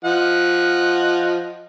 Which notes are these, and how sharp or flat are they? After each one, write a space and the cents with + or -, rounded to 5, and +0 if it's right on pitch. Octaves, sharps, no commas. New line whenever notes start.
F3 +0 D#5 +0 F#5 +0